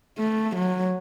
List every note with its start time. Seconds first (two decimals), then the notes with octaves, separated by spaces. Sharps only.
0.18 A3
0.56 F#3